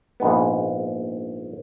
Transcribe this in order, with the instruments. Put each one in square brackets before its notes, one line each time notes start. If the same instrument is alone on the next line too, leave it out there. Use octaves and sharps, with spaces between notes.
[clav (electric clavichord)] A#1 G#2 B3